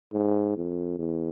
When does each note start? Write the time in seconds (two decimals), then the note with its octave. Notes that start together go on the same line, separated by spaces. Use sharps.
0.13 G#2
0.56 F2
0.98 E2